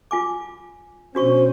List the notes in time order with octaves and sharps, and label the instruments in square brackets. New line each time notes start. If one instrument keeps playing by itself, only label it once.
[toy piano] F4 G#5 D6
[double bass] B2 C#4 [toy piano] D4 F#4 C#6 [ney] C5